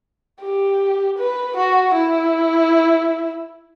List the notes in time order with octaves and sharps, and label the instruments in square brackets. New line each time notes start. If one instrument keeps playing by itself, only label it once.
[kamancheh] G4
B4
F#4
E4